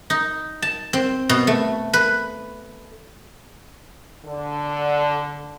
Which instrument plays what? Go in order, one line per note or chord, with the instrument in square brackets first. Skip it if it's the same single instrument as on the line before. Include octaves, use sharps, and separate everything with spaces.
[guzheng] D#4
A5
C4
B2
A3
B4
[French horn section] D3